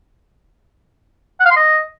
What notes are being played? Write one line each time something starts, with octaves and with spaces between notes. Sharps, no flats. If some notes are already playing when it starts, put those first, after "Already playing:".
F#5
F5
C6
D#5